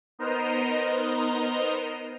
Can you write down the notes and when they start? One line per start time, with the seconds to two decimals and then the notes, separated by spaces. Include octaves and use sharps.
0.19 B3 D#4 A#4 C5 D#5 A#5